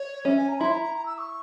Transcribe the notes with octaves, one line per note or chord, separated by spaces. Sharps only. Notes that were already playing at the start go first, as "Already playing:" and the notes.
Already playing: C#5
C#4 E5
G#5
A#5
E4 C6
A#5
A#5
A#5
E6
C#6